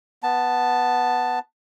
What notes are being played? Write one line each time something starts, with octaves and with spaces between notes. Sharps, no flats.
B3 A5